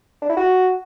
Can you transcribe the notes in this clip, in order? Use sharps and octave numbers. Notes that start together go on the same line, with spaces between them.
D4
E4
F#4